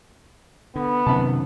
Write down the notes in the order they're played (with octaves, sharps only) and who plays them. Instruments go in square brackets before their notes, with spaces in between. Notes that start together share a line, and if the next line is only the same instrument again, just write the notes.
[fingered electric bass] D3 [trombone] B3
[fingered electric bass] F#2 D#3 [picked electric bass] C3 C4 [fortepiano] A5 B5